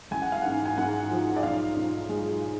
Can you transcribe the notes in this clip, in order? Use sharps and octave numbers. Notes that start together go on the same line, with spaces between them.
A1 G#5
F#5
F5
G#2 F#5
G#5
G#2 F#5
F3
D5
B1 F5
B1
G#3